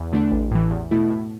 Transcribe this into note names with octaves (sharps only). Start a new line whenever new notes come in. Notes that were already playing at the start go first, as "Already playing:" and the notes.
Already playing: E2
D3 A3 D4
A1
A2 E3
E2
B2 A3 E4
A2